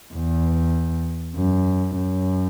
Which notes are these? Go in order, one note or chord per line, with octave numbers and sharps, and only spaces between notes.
E2
F#2
F#2